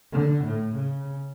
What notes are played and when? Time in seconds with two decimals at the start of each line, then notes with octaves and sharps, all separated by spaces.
0.12 D3
0.44 A2
0.76 C#3